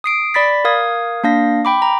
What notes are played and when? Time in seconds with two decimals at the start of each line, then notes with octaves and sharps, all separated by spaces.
0.04 D#6 C7 D7
0.34 D5 B5 A6 B6
0.65 A#4 F5 D#6 G#6
1.24 A#3 D4 F5 A#6
1.65 G5 B5 D6
1.82 A#5